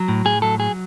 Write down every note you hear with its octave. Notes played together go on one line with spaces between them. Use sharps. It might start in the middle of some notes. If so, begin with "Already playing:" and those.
Already playing: F#3
A2
A2 G#4
F#3 A4
F#3 G#4